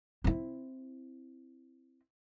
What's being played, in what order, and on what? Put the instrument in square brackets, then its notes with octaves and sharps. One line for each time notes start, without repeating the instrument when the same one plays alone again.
[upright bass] C4 E4